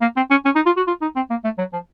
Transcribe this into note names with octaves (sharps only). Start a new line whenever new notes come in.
A#3
C4
C#4
C#4
D#4
F4
F#4
F4
D#4
C4
A#3
A3
F#3
F3